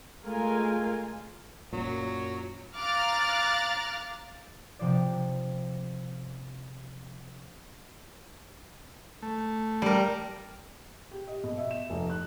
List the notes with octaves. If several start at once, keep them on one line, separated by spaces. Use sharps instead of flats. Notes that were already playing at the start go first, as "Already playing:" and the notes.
G#3 A3 F4 A#4 F5 G#5
F#2 A#2 F#3
F5 A#5 D6 F6 F#6 A6
C3 F3 D5
A3
G3 A#4
G4
D#5
B2
E5
E7
F1
F#6